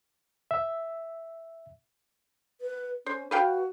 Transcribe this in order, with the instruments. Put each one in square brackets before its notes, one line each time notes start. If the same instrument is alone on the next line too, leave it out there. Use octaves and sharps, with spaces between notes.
[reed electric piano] E5
[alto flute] B4
[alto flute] C#4 [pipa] C5
[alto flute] F#4 [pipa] B4 F5 G5